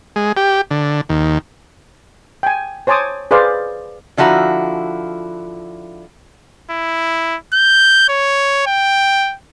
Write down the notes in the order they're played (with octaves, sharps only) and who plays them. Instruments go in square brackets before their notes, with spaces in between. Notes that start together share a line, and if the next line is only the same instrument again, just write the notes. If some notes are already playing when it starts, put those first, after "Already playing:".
[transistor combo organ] G#3
G4
D3
D#2
[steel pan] G5 G#5
C5 C#5 G#5 A5 D6 D#6
G#4 B4 C5 D5 F5
[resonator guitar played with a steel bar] D3 F3 E4 F#4 A#5
[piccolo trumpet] E4
G6
C#5
G5